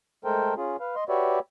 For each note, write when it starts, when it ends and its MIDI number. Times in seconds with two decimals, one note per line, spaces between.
0.25 0.54 56
0.25 0.54 57
0.25 0.54 69
0.25 0.54 70
0.25 0.54 72
0.25 0.54 79
0.57 0.77 61
0.57 0.77 65
0.57 0.77 68
0.80 0.95 71
0.80 0.95 77
0.96 1.04 75
0.96 1.04 84
1.09 1.39 66
1.09 1.39 67
1.09 1.39 71
1.09 1.39 73
1.09 1.39 74
1.09 1.39 76